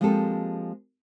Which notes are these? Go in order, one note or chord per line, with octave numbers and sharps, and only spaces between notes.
F3 G#3 A#3 C4 G4 A4